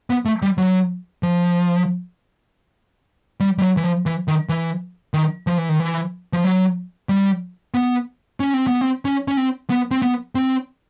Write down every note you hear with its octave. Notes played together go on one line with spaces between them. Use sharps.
B3
A3
G3
F#3
F3
G3
G3
F#3
E3
F3
E3
D#3
E3
D#3
F3
E3
D#3
E3
F3
F#3
G3
B3
C#4
C4
B3
C4
C#4
C#4
C4
B3
C4
B3
C4